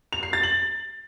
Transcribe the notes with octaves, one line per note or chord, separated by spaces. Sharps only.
F7
C7
A6
F#7